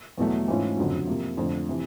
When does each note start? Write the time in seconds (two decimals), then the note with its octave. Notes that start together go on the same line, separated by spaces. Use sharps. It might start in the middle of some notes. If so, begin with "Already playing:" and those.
0.18 E2 B2 F#3 A3
0.48 G#2 E3 A3 C#4 F4
0.77 F#1 F2 D3 F#3
1.07 C3 F3 A#3
1.37 F2 D3 F3 A3 D4
1.69 C3 E3